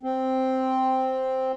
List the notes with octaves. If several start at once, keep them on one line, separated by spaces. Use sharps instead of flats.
C4